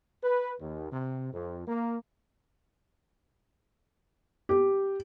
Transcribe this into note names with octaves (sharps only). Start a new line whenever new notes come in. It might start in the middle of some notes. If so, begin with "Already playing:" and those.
B4
D#2
C3
F2
A#3
G4